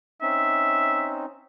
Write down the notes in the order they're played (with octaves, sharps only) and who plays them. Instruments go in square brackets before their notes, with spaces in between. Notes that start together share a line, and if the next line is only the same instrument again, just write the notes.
[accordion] C4 C#4 D#4 [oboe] E5